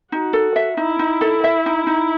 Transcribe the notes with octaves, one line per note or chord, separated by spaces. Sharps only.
D#4 F#4
A4
E5
D#4 E4
D#4
A4
E5
D#4
D#4